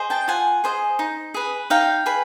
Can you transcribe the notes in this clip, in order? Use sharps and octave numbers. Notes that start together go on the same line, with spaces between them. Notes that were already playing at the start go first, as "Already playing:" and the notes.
Already playing: G#4 C5 D#5
G5 A5
F4 F#5 G#5
G#4 C5 D#5
D#4
G#4 B4
D#4 F5 G5
G#4 B4